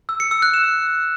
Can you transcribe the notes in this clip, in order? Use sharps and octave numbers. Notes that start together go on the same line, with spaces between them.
E6
C#7
E6
F#6
E7